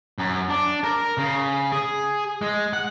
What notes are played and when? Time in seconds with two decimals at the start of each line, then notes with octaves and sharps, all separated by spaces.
0.18 F#2
0.49 D4
0.84 A#4
1.18 C#3
1.72 G#4
2.42 G#3
2.73 F#5